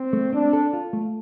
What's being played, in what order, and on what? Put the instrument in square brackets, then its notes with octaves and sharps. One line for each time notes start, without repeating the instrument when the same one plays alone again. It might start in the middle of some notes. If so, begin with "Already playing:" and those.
Already playing: [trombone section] C4
[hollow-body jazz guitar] A3
[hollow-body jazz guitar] C4 [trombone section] D4
[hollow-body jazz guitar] A4
F4
A3